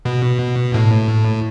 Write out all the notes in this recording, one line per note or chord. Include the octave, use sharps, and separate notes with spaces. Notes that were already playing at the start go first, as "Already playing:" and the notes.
B2
A2